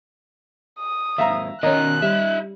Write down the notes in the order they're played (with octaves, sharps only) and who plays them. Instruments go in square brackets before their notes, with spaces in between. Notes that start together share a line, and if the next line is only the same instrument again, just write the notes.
[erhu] D#6
[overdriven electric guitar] D#2 G#2 [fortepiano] E5 F5 A#5
[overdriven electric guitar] B2 A#4 [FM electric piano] D#3 C#4 [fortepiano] D#5 [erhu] F#6
[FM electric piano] G3 [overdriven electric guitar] D#4 E5